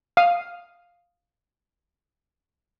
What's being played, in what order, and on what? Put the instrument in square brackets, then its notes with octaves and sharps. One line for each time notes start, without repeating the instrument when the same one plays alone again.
[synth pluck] F5 D#6